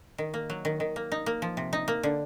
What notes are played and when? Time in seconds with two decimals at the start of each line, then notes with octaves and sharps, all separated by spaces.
0.18 D#3
0.34 A#3
0.50 F#3
0.65 D#3
0.80 D#3
0.96 A#3
1.12 D#4
1.26 A#3
1.42 F3
1.57 C3
1.73 D#4
1.88 A#3
2.03 D3